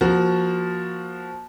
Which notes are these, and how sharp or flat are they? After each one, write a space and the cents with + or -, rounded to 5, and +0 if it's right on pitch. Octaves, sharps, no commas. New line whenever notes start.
F3 +0 A#3 +20 F#4 +0